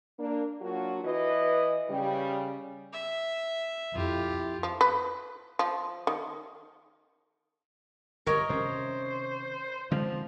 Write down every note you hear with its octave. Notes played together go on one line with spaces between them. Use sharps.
A#3 D4
F#3 A#3 D4 F4 F#4
E3 B4 D5 D#5
C#3 G3
E5
F2 E4 F4 G4
F3
B4
F3
D#3
G1 G3 A#4 C#5 D#5
C3 D#3 C#4 C5
D3 F3 G#3 C4